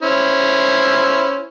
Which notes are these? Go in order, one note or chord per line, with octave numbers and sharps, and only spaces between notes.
C#4 E4 C5